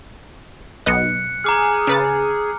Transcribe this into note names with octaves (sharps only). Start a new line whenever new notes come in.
B1 B3 D#5 F#6 C#7
G#4 A#5 D6 F6
C#3 B4 A6